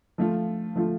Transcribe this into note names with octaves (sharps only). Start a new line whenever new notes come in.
F3 A3 F4
F3 A3 F4